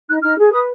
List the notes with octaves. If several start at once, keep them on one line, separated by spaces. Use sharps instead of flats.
D#4 F#6
D#4 F6
G#4
B4 D#6